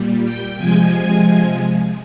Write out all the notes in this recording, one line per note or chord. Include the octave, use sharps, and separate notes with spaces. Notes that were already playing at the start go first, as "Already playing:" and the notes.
Already playing: A#2 G3
G5
C3 F3 G#3 G#5